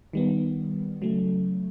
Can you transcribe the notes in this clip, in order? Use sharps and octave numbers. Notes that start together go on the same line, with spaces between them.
D#3 G3 B3
C#3 F#3 A3